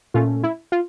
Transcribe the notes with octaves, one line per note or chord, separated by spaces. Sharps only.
A#2 A3 C#4 F4
E4
F4